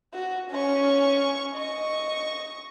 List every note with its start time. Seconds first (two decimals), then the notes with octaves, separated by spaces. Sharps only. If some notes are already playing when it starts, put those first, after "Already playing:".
0.14 F#4
0.51 C#4 C#6
1.55 D#5 C#6